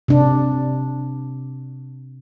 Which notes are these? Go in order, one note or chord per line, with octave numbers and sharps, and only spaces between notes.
C3 D4